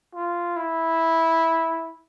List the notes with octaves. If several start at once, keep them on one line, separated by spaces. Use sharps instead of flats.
F4
E4